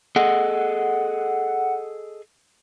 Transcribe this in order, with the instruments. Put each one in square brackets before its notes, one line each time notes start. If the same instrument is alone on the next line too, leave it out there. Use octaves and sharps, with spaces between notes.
[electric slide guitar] G#4 A4 D#5 [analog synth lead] F#5